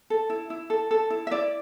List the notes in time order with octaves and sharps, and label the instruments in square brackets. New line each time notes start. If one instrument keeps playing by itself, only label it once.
[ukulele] A4
E4
E4
A4
A4
E4
E5
E4 D5